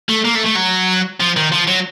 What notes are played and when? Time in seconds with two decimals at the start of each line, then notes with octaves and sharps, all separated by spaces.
0.09 A3
0.25 A#3
0.36 A3
0.46 A3
0.56 F#3
1.20 F3
1.37 D#3
1.52 F3
1.68 F#3